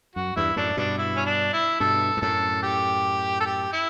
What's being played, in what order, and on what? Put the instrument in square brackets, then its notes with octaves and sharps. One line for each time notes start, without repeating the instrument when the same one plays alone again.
[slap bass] F#2 [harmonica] F#4
[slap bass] E2 G2 [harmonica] E4
[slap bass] F#2 A2 [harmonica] D4
[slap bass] G2 B2 [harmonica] D4
[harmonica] E4
C#4
D4
E4
[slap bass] G2 B2 [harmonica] A4
[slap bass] G2
[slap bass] F#2 A2 [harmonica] A4
[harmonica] G4
A4
G4
E4